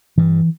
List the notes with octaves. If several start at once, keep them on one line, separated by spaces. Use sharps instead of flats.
G2 E3